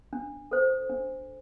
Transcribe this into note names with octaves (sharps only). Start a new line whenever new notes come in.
D4
A4 C5
D4